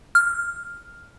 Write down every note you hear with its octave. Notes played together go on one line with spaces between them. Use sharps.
F6